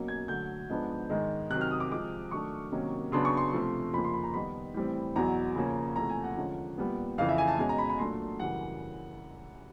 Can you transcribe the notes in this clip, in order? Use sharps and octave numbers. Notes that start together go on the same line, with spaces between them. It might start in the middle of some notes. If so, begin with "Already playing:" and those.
Already playing: B2 F#3 A#3 C#4
G#6
D3 F#3 A3 G6
G#2 F3 G#3 B3 D4
G#2 D#3 G#3
C3 D#3 F#3 F#6
F6
D#6
D6
C3 F3 G#3 D6
D#3 F#3 A3 D4 C#6
C3 D#3 F#3 A#3 C#4
C#3 F#3 B3 D4 C6
C#6
C6
C3 F3 A3
F2 C#3 F3 A#3 B5
C6
B5
A#5
D#3 G3 B3 D#4 B5
A2 E3 G3 C4
E2 B2 F#3 A#5
C#3 F3 A#3 C#4
E2 C3 F3 A3 A#5
G#5
F#5
D3 F3 G#3 C#4
A#2 G3 B3
F2 C#3 E3 F5
E5
G#5
A5
B2 G#3 C#4 G#5
A#5
B5
B5
A#2 F#3 A3 D4 C6
F#2 C#3 E3 G3 F#5